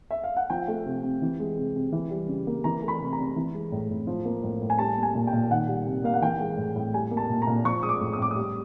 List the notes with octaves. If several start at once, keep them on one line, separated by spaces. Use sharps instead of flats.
E5
F5
F#5
F3 G5
A3
C3
C3
E3
G#3
C3
C3
E3
G3
C#3
A#3
E3 A#5
A3
B5
C3
A#5
C3
E3
G#3
A2
A2
F3
A#3
A2
A2
G#5
G3 A5
A#3
G#5
A#2
G5
A#2
D#3 F#5
G3
C3
A#3 F5
F#5
E3 G5
G#3
A2
A2
G3 G#5
A#3
A5
A#2
A#5
A#2
F3 C#6
G#3 D#6
D6
A2
D#6
A2 D6
D#6
G3